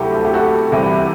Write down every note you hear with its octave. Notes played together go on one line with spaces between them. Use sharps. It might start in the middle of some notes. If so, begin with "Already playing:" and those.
Already playing: D2 C3 F#3 E4 G4 A4
A4
G4
F#4 A4
C2 C3 E3 E4 G4